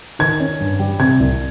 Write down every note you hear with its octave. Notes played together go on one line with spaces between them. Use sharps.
D#3 G#6
C#4
G2
G3
C3 G#6
C2